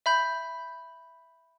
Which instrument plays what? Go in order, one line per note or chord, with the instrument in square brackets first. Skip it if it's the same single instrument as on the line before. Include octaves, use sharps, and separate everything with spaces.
[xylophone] E5 B5 G6